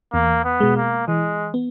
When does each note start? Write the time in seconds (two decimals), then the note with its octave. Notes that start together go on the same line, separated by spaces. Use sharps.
0.13 E2 A#3
0.44 B3
0.60 B2 G#3
0.76 A#3
1.08 E3 G#3
1.54 B3